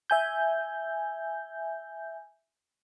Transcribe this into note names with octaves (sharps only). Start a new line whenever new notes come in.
E5 G#5 G6